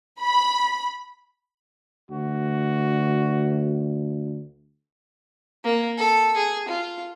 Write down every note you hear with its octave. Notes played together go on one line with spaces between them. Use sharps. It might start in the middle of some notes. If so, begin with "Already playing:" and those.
B5
D2 F#4
A#3
A4
G#4
F4